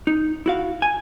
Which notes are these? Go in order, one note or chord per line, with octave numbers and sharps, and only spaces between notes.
D#4
E4 F#4 F5
G#5